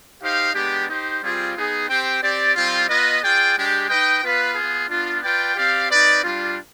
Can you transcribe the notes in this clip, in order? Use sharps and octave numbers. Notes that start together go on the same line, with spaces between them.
D#4 G4 C5 F5
G#3 B3 D4 G4
D#4 G4 C5
G3 C4 F4 G#4
B3 D#4 G#4
C4 G4 C5 G5
C4 G4 D5
G3 C4 F4
B3 F4 B4 D#5
F4 G#4 D5 G5
G#3 D4 G4
D#4 B4 D#5 G5
B3 F4 B4 F5
B3 F4 G#4
B3 D4 F4
F4 B4 D5 G5
C4 G4 D5 F5
C4 D#4 B4 D5
G3 D4 F4